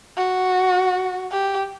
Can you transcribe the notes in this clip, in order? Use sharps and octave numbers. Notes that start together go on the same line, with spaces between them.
F#4
G4